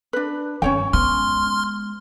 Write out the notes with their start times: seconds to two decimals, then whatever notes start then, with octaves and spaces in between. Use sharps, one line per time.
0.13 D4 B4
0.62 G2 D#3 C#4 C#5 G5
0.93 G#3 B3 C6 F6